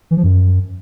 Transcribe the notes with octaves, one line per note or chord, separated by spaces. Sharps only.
E3
F3
F#2